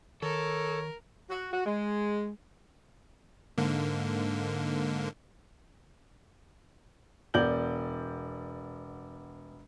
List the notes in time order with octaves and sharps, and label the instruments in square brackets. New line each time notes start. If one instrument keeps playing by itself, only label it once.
[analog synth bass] D#3 [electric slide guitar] A4 [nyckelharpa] A#4 [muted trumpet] C#5
[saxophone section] F#4
F#4
G#3
[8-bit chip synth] G#2 D3 A#3
[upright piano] E1 B3 D5 G6 F#7